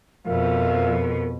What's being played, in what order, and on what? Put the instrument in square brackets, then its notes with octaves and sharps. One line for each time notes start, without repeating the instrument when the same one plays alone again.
[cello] F2 B2 [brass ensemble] F3 E5 F5 [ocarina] A#4